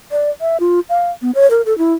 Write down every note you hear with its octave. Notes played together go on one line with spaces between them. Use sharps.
D5
E5
F4
F5
B3
C#5
A#4
A4
E4